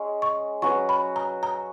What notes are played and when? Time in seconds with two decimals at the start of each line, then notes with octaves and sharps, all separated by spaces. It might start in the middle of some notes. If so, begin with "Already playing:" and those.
Already playing: G#3 C#4
0.22 C#6
0.62 F#3 C#4 F#4 B4 C#6
0.89 B5
1.16 A#5
1.43 A#5